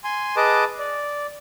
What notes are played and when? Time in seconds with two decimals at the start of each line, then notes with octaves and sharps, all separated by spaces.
0.04 G#5 C6
0.36 G#4 B4 D#5 A5 D6
0.79 D5